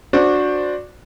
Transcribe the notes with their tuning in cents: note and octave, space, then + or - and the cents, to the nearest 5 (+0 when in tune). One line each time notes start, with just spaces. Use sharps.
D4 +0 F#4 -20 C5 +0